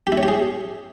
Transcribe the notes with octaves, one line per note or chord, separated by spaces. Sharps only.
G4
E4
C#5
G4
G#4